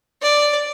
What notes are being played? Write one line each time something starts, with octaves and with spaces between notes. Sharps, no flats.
D5